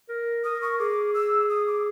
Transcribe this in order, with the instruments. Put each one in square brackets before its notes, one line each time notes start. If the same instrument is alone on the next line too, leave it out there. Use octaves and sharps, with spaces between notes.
[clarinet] A#4
[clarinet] A#4 [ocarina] D#6
[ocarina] C#6
[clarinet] G#4 [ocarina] D6
[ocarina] E6
D#6
D6